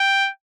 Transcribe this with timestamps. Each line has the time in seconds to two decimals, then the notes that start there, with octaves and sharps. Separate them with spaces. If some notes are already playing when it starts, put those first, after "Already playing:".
Already playing: G5